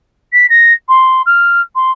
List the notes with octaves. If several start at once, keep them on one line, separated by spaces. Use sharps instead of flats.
B6
A#6
C6
F6
C6